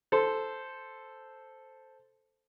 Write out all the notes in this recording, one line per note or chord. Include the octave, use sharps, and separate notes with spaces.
A4 C5